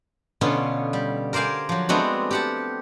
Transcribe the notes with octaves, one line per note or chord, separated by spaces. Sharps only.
B2 D3 B3 C#4 F4
G3
A#4 C5 D5 F5 G#5
F3 F#3
G#3 A3 B3 C4 D4 F#4
G4 F#5 A5